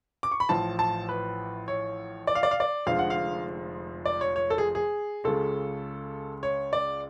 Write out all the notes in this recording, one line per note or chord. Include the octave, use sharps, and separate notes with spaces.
D6
C#6
B5
A1 A2 F3 A5
A5
B4
C#5
D5
F5
D5
F5
D5
F1 F2 D3 F3 G#3 F5
F#5
F5
D5
C#5
C#5
A4
G#4
G#4
C#2 C#3 G#3 A4
C#5
D5